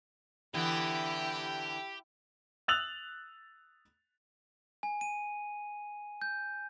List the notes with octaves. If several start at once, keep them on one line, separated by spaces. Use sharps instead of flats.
D3 E3 B3 E4 G4 G5
D#6 E6 F#6 A6 F7 F#7
G#5
D#7
G6